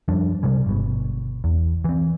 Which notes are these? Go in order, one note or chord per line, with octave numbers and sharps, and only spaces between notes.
F#2 F3 G3 D4
C3 G3 G#3
G1 B2
E2
E3 C4